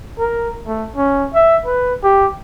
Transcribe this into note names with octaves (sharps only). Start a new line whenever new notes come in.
A#4
A3
C#4
E5
B4
G4